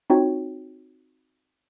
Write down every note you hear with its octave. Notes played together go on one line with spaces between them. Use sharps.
C4 D#4 F4 F#4 C#5 G5